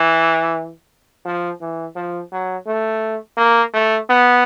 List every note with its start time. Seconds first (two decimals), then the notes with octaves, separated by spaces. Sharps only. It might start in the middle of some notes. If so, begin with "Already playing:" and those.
Already playing: E3
1.26 F3
1.61 E3
1.96 F3
2.32 F#3
2.67 A3
3.37 A#3
3.74 A3
4.10 B3